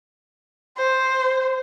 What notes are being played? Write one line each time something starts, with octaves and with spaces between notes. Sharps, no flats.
C5